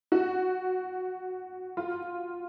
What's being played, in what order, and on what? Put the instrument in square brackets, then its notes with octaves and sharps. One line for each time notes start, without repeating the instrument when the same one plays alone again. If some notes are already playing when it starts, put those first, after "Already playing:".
[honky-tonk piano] F#4
F4